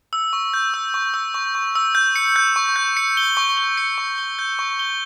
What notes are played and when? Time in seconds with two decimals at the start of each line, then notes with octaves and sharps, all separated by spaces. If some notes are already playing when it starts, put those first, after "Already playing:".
0.13 E6
0.33 C#6
0.54 G6
0.74 E6
0.94 C#6
1.14 E6
1.34 C#6
1.55 C#6
1.75 E6
1.95 G6
2.16 C#7
2.36 G6
2.56 C#6
2.76 G6
2.97 C#7
3.17 G7
3.37 C#6
3.57 G7
3.77 C#7
3.98 C#6
4.18 G7
4.39 G6
4.59 C#6
4.79 G7